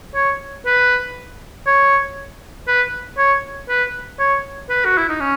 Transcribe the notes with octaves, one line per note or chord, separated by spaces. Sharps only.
C#5
B4
C#5
B4
C#5
B4
C#5
B4
F#4
E4
D#4
C#4